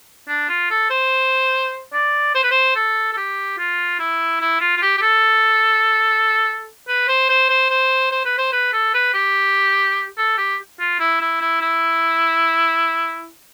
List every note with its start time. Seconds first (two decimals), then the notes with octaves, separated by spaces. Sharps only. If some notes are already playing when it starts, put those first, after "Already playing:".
0.28 D4
0.49 F4
0.70 A4
0.90 C5
1.93 D5
2.35 C5
2.43 B4
2.51 C5
2.76 A4
3.13 A4
3.17 G4
3.58 F4
3.99 E4
4.41 E4
4.61 F4
4.77 F4
4.82 G4
4.98 G4
5.02 A4
6.88 B4
7.09 C5
7.29 C5
7.50 C5
7.70 C5
8.11 C5
8.25 B4
8.38 C5
8.53 B4
8.73 A4
8.94 B4
9.14 G4
10.18 A4
10.38 G4
10.79 F4
11.00 E4
11.21 E4
11.41 E4
11.62 E4